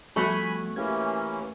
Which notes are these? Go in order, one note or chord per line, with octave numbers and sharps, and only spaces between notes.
F3 G3 A3 B3 F#4 F#5 G#5 B5
E3 A#3 C#4 G4 G#6